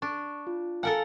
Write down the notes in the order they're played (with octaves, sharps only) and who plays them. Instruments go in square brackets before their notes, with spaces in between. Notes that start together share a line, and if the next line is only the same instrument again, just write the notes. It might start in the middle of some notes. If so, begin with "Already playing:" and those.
[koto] D4 [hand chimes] C#6
[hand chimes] F4
[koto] A4 A#4 F#5 [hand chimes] F5 G#5 A5